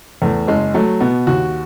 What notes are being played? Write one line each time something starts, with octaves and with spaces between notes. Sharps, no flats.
E2 A3
F#1 G#3
F#3 A3
B2 B3
D#2 F#4